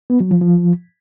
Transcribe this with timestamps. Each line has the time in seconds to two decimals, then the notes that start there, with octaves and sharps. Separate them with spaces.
0.10 B3
0.20 F#3
0.31 F3
0.42 F3